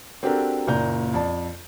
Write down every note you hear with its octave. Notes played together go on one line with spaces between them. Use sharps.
C4 D4 F#4 G4 A4 A#4
F#1 A#2 D5 A#5 G6
F2 D5 A5